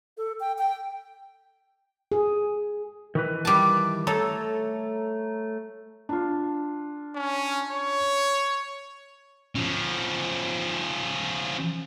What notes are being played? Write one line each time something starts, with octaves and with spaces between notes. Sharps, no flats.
A4
G5
G5
G#4
D#3 E3 B4
G3 A5
A3 A4 C#5 A#5
D4 F4
C#4
C#5
F3 C#4